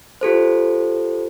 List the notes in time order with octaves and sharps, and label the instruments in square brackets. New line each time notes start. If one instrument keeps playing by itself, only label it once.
[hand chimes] F4 G4 A4 C5